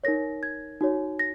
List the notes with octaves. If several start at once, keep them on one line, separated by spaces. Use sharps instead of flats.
D#4 A#4 C#5 A#6
G#6
D#4 F#4 C#5
A#6